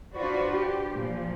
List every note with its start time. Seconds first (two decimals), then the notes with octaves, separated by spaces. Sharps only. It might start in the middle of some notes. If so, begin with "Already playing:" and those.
0.14 D4 F4 F#4 B4 C5 D5
0.53 G4
0.94 A#2 F3